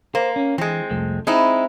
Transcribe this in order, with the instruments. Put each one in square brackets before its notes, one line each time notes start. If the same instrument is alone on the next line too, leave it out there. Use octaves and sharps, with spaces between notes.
[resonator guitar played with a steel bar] A#3 [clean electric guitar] C5
[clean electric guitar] C#4
[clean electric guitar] E3 [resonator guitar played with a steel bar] G#3 C4
[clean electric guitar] C2 F2 A3
[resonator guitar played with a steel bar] G#3 D#4 E4 [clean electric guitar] C4